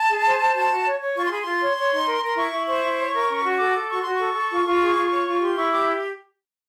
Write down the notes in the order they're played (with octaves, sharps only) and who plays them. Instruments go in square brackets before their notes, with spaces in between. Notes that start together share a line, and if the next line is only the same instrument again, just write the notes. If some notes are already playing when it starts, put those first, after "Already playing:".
Already playing: [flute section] A5
G#4
C5
C5
F#4 A5
F#4
C#5
C#5
F4 C#6
C6
G#4 B5
C6
F4
C#5
C#5
D#4
A#4
A#4 C6
E4 C#6
E4
C5 C#6
E4
C#5
A#4
C#4
F#4
C#6
A4 D6
A4
F#4 C#6
F#4 C6
A4 C#6
A4
F4
F4
G#4
F4
C#5
F4
G4 C6
E4 C#6
G4 D6